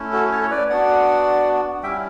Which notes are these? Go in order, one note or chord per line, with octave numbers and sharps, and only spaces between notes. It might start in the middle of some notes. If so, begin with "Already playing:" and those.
Already playing: A3 C#4 E4
F#4 A4
A4 C#5
C#5
B4 D5
B3 D4 F#4 D5 F#5
G3 C#4 E4 E5 G5